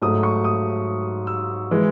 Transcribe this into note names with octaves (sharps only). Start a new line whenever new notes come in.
G#2 F#3 A3 D#6
C#6
D#6
E6
E3 G#3